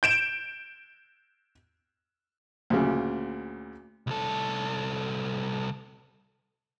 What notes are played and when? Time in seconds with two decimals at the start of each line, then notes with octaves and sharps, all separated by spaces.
0.03 G6 D7 E7
2.70 D2 A#2 C#3
4.07 C2 A4